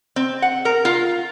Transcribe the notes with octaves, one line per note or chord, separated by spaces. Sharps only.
C4
F#5
A#4
F4